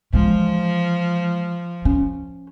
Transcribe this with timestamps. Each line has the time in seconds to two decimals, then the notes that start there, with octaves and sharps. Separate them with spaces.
0.13 E3 F3 G#3
1.85 C#4